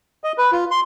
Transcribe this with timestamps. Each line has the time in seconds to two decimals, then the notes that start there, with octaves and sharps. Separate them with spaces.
0.24 D#5
0.38 B4
0.52 F4
0.71 C6